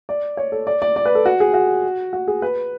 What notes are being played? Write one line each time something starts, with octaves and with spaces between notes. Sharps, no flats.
D5
C#5
A4
D5
D5
D5
B4
A4
F#4
G#4
F#4
F#4
G#4
B4